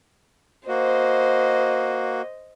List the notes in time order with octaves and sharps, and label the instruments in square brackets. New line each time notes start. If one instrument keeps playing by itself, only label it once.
[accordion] A#3 F#4 [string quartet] C5 D#5